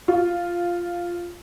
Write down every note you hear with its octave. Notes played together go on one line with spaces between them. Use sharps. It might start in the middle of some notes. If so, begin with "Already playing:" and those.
F4